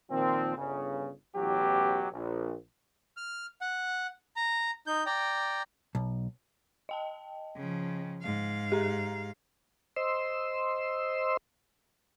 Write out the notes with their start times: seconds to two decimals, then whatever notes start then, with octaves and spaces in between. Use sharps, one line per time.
0.11 A#2 D#3 F3 C4
0.56 G1 C#3
1.35 A1 E2 B2 F#3 G4
2.12 A#1
3.17 F6
3.61 F#5
4.36 A#5
4.87 D#4 G6
5.06 D5 G5 A#5
5.95 B1
6.89 D#5 G5 A5
7.56 C#3 F3
8.23 G#2 F5
8.72 G4 G#4 A#5
9.97 C5 D#5 C6 E6